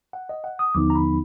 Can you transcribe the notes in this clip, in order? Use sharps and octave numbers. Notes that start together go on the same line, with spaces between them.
F#5
D#5
F#5
D#6
D#2 D3 F3 B3 D#4 D6
A#5
B5